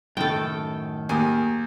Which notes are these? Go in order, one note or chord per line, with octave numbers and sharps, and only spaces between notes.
F#2 A2 D#3 A4 G5
D#2 G#4 A#4 G#5